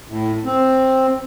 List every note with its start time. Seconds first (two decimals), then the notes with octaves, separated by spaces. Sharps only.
0.08 A2
0.45 C4